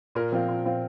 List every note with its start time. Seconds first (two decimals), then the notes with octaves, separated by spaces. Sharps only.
0.15 A#2 A#4
0.32 F3 C4 F4
0.48 A#2
0.64 F3 C4 F4